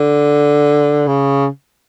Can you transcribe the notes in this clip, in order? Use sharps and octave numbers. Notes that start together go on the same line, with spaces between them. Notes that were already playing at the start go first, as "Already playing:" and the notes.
Already playing: D3
C#3